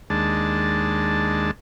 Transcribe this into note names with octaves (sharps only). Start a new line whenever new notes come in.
D#2 G#3 D4 A5